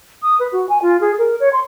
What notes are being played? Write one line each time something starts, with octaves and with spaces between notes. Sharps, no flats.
D#6
B4
F#4
G#5
F4
G#4
A#4
C#5
C6